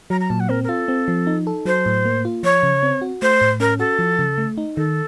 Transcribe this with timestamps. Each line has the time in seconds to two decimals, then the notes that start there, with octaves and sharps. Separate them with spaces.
0.10 F#3 A#5
0.21 A#5
0.30 A#2 A5
0.40 F#5
0.49 C4 A#4
0.64 A#4
0.69 F4 A4
0.88 C4
1.08 F3
1.27 D#4
1.47 A4
1.65 F#3 C5
1.86 A2
2.05 A#3
2.25 F4
2.43 F3 C#5
2.63 C#3
2.83 C4
3.01 F#4
3.22 A3 C5
3.41 A2
3.60 C#4 A#4
3.79 F#4 A4
3.99 F3
4.19 C#3
4.38 A3
4.58 D#4
4.76 D#3 A4